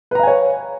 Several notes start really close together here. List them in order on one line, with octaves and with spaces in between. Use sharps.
B4 A#5 F5 G#5 C#5